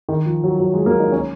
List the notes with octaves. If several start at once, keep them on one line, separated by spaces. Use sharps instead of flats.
D#3
F3
F#3
F#3
G#3
A#3
D#4
C#4